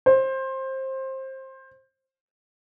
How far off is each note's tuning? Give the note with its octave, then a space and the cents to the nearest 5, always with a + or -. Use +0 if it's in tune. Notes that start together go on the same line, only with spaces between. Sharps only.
C5 +20